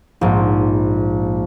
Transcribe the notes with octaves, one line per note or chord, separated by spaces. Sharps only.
A#1 G#2